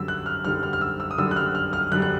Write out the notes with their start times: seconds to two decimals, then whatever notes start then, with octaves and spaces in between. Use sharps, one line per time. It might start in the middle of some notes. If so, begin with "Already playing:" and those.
Already playing: F#2 D3 G3 E6
0.08 F#6
0.26 F6
0.45 F#2 D3 G3 F6
0.63 F6
0.73 F6
0.81 E6
1.00 E6
1.11 D#6
1.18 F#2 D3 G3 E6
1.31 F#6
1.36 F6
1.55 F6
1.73 F6
1.92 F#2 D3 G3 F#6
2.02 F#6